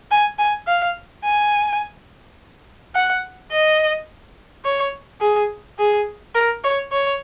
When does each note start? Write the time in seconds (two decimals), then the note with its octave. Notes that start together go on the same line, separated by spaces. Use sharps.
0.11 G#5
0.39 G#5
0.67 F5
1.24 G#5
2.95 F#5
3.52 D#5
4.65 C#5
5.21 G#4
5.79 G#4
6.35 A#4
6.64 C#5
6.92 C#5